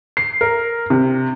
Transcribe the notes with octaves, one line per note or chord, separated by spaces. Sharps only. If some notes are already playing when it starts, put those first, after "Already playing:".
C7
A#4
C3